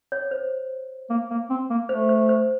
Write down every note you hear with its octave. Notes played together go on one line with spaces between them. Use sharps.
C#5
C5
A#3
A#3
C4
A#3
A3 C5
C5
C5